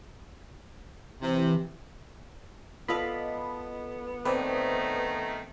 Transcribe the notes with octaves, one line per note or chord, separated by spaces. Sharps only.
C3 E3
B3 F4 A4 D5 D#5 F5 B5
D#3 A3 C4 B4 D5 D#6